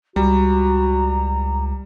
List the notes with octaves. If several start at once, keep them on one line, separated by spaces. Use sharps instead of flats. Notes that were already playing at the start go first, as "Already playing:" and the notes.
C#2 G3 F#4 A#5